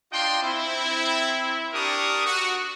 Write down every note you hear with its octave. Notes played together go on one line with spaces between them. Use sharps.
D4 F4 D#5 G5 C6
C4 E4
D4 G4 A#4 C#6 D#6
F#4